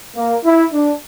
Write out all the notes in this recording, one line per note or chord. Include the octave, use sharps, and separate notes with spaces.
A#3
E4
D4